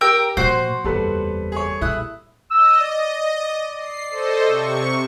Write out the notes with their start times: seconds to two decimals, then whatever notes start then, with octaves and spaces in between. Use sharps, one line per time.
0.01 G4 A#4 G5 E6
0.37 A#2 F3 F#4 C5 C#6
0.84 F#1 E2 G3 A4 B4
1.52 G#4 C#5
1.81 A#2 E4 D#6 F#6
2.51 D#5 E6
2.80 D5
3.34 D5
3.78 C7
4.10 A4 C5 D#5
4.46 C3 C#6